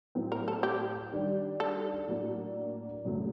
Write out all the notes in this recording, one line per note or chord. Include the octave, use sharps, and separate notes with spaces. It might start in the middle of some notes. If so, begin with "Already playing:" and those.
A2 F#3 C4
A#4
A4
G4
D#3 G3 D4 G4
A4
A2 F#3 A#3 D4 F#4
F#1 F#2 F#3 A3